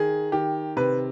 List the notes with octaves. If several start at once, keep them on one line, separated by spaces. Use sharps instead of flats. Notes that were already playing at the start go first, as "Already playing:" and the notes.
Already playing: D#3 G#4
D#3 G4
C3 B4